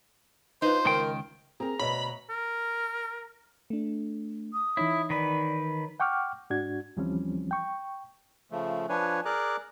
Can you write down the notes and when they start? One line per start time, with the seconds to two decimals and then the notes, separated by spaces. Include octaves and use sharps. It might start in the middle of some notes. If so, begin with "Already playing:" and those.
0.62 D#4 F4 B4 C5
0.86 C#2 D#3 A#4 G5
1.60 C4 G#4 A#4 A#5
1.79 D2 B2 B3 C#5 D#5 B5
2.30 A#4
3.70 A3 D4
4.53 D#6
4.77 E3 D#4 E4 C#5
5.10 D#3 B4 D5
6.00 F#5 G5 C#6 D6 F6
6.50 G#2 D4 F#4 G#6
6.97 D#2 E3 F3 G3 C4 C#4
7.51 G5 C#6
8.51 C#3 F3 A3
8.89 F3 D4 B4 C#5 G#5
9.25 G#4 A#4 D5 A#5 D6 F#6